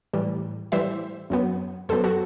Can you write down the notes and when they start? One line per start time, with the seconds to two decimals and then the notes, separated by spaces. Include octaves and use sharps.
0.13 A2 E3 G3
0.72 A2 E3 G3 C5 E5
1.30 F#2 F#3 B3
1.89 F#2 F#3 B3 A4 C5
2.04 F#4 A4